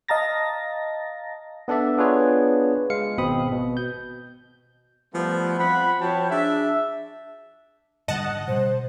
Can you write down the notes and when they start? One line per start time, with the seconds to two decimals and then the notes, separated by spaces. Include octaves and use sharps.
0.08 D#5 F5 A5 A#5 A6 A#6
1.68 B3 D4 A4 D5 E5
1.98 B3 D4 F4 G#4 B4 C#5
2.90 G#3 F5 C#7
3.18 G#1 B2 C4 B5 D#6
3.52 B2
3.77 G6
5.13 F3 G3 A3 B3
5.58 F3 C4 F#5 B5
6.00 F3 F#4 C#5 G5 A5
6.31 D4 G#4 E5
8.08 G#2 D3 G3 D#5 F#5 A5
8.48 B2 G3 C5